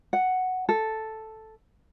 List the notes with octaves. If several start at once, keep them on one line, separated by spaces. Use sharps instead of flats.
F#5
A4